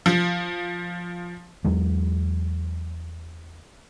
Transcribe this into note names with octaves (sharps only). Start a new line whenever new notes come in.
F3
E2 F#3 G#3